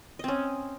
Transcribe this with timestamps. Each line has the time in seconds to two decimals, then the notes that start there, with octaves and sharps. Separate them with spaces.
0.19 D#5
0.24 C4
0.28 C#4